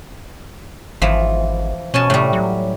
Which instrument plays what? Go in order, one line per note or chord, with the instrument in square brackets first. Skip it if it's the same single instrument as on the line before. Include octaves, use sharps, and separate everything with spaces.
[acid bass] G#1 [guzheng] E3 F3
[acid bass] B2 [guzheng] C#4 G#5 A5
[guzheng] A2 G3 [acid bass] C3
[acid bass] F#3